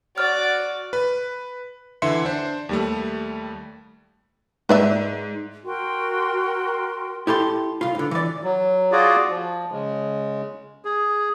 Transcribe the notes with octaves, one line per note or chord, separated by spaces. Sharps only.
F#4 D5 F6
B4
D3 E3 E5 C6 C#7
D4 C5
D#2 G3 A3
G#2 B4 D5 E5
F#4 A#4 G5 C6
E4 G4 A4 C6
C2 F4
G2 D3
E3 D5
F#3
F4 F#4 G#4 D5
F3
C#3 G#3
G#4